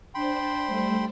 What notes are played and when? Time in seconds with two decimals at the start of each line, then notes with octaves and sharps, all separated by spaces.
0.14 D4 C5 G5 B5 C6
0.65 G3 A3 C5